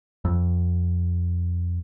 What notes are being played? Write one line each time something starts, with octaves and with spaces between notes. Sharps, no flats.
F2